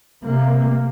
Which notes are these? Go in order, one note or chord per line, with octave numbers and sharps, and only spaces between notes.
C3 A#3